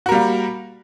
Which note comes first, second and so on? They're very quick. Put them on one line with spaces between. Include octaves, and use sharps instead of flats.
F#4 A#4 G3 A#3